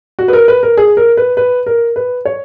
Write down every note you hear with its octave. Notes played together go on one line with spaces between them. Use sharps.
F#4
B4
A#4
B4
A#4
G#4
A#4
B4
B4
A#4
B4
C#5